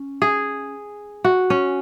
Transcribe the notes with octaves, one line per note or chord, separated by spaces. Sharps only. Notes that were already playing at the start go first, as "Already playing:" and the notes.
Already playing: C#4
G#4
F#4
C#4